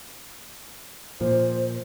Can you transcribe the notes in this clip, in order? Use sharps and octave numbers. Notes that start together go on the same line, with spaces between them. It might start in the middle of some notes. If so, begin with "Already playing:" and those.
A#2 F3 C5